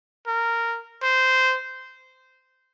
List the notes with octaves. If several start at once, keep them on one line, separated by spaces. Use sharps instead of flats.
A#4
C5